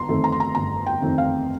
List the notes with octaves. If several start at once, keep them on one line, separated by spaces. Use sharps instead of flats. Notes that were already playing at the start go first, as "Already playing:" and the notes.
Already playing: G1 A#5 C6
F2 D#3 A3 C4
A#5
C6
A#5
G1 A#5
G5
F2 D#3 A3 C4
F5